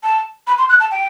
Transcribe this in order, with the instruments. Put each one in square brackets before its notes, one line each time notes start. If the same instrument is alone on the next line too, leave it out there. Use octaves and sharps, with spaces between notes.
[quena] A5
B5
C6
F#6
A5
G5